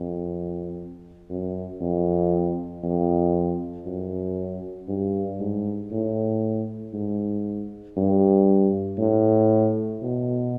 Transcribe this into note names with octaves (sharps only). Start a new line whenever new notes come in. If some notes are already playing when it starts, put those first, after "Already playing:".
Already playing: F2
F#2
F2
F2
F#2
G2
G#2
A2
G#2
G2
A2
B2